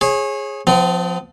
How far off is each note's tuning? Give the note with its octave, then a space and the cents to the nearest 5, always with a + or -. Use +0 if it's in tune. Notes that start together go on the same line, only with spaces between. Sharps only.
G#4 +0 C#5 -30
F3 +15 C4 -45